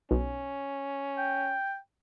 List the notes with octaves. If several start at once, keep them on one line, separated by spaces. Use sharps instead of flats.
B1 C#4
G5